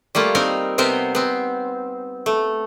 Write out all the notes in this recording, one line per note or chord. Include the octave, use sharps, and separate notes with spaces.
G3 A3 A#3 F4
C4 D#4 A#4
C3 B3 C4 A#4 C5
B3 C4
A3